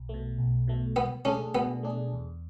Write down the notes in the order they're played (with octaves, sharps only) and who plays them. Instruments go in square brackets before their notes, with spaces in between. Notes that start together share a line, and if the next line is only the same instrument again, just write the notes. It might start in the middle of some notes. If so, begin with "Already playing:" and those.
Already playing: [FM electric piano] B1
B2 A3
B1
B2 A3
[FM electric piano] B2 [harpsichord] B3
[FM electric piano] A3 D4 G#4 [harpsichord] C#4
[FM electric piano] B2 [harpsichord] B3
[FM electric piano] A3 D4 G#4
E2